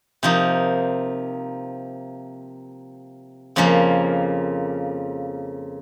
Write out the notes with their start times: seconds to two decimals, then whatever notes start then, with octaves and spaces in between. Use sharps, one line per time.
0.23 C3 F3 A#3 D#4
3.56 F2 C#3 F3 A#3